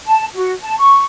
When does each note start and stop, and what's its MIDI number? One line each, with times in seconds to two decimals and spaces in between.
0.06 0.25 81
0.35 0.51 66
0.61 0.77 81
0.78 1.04 85